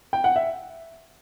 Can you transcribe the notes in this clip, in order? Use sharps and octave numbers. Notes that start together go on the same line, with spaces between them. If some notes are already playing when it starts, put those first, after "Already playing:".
G5
F#5
E5